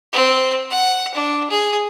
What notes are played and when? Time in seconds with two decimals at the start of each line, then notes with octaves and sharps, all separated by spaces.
0.13 C4
0.71 F#5
1.14 D4
1.51 G#4